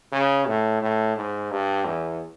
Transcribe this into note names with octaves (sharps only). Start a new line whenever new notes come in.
C#3
A2
A2
G#2
G2
E2